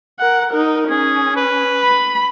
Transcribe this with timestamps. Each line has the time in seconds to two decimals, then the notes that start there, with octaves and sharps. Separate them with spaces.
0.19 A#4 F#5
0.50 D#4 A#4
0.89 C#4 G#4
1.36 B4
1.83 B5